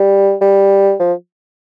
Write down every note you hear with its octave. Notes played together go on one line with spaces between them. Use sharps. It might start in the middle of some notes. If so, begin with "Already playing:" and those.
Already playing: G3
G3
F3